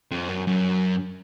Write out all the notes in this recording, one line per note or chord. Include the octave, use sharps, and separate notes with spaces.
F2
F#2
F#2